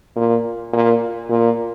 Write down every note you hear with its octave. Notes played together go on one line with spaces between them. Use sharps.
A#2
A#2
A#2